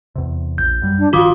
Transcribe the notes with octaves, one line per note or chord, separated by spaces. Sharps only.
E2 C3
A#1 G6
F#2 G3
D4
G1 D#3 F3 F4 F#4 D6 D#6